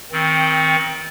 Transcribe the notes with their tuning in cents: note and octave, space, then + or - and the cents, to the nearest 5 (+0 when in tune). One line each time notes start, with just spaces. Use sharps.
D#3 +30 C4 +0